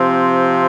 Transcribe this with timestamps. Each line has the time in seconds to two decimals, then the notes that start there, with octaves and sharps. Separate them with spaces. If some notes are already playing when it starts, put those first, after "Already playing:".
Already playing: C3 F3 C4